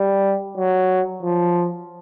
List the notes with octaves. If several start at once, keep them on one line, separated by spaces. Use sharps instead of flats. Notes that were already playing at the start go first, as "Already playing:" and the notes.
Already playing: G3
F#3
F3